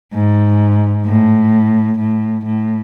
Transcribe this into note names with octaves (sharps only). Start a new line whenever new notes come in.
G#2
A2
A2
A2